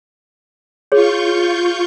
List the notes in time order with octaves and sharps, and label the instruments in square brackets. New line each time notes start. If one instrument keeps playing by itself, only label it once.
[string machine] F4 C#6 G6 [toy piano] G#4 C#5